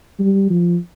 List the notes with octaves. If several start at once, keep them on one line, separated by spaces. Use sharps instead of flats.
G3
F3